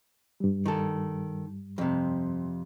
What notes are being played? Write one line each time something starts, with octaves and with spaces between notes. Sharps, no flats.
G2 G3
D#3 A4
F2 C3